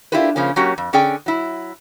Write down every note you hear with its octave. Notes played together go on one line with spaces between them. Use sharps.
D4 E4 F4 G4 A#4 B4
C#3 F3 A#3 C#4
F#3 A#3 C#4 F#4 G4
F2
D3 C#4 G#4 D5 G5
F#3 E4